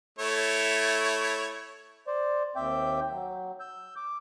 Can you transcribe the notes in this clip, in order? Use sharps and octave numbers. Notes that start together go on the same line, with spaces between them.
A3 E4 C#5
C5 D5
D#2 C4 E5 G5 D6 G6
F#3
E6 G6
D6